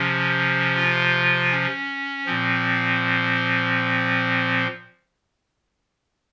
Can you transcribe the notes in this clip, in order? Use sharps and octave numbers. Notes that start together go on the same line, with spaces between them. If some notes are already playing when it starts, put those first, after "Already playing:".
Already playing: C3 F3 C#4
F4
C#4
A#2 F3 C4